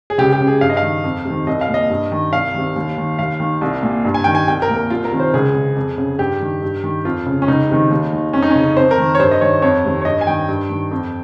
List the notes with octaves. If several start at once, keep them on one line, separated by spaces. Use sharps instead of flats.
G#4
C#2 G4
G4
C#3
G#4
G2 F5
D#5
F5
D#3
F2
C3 D#3
C2 D#5
F5
A#2
D#5
G2
D#3
C2 F5
C3 D#3
D#2
D#3
D#2 F5
D#3
C2
A#2
G2
G#5
D#3 G5
G#5
C2 G5
A#4
A#2
A#4
C2 F4
A#4
C3 D#3
C5
C#2 G#4
C#3
F2
C#3
G2 G4
D#3
G2
D#3
F2 F4
C#3
C#4
C#2 D#4
C3 D#3
D#2
D#3
F2 C#4
D#4
C#3 C#4
F2 C5
A#4
D#3
C#5
G2 C5
D#5
D#3 C#5
F2 C#5
C3 D#3
C#5
G2 D#5
G#5
D#3 G5
G2
D#3
F2